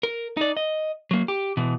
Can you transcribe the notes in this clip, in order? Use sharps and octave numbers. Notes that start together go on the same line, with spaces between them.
A#4
D#4 D5
D#5
F#3 A#3
G4
B2 E3